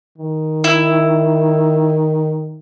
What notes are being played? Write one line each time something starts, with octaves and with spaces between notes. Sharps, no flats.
D#3
E4